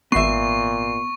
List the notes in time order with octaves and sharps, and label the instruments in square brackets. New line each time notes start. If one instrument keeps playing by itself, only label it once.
[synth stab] G#1 C7 [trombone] A#2 [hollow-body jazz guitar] B3 E5 [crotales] C#6